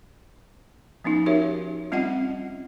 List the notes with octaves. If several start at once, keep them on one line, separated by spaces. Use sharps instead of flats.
F3 B3 C#4 D#4
D#4 F#4 G4 A#4 C#5 E5
G3 C4 C#4 F4 D#5 F#5